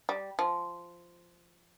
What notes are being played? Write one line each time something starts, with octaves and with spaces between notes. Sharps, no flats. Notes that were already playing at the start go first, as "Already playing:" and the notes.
G3
F3